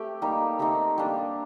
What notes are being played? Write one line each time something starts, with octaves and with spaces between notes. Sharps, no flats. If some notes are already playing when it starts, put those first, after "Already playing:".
Already playing: A3 C4 G4
G3 A#3 D#4
A3 C4 D#4 G4
G3 A#3 D4